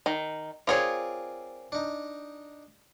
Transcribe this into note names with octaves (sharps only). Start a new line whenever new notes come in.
D#3
C4 F4 G#4 A#4 C#5 D5
D4 D#4